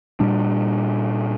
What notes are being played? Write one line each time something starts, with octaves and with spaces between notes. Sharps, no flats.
A#2 G3 D4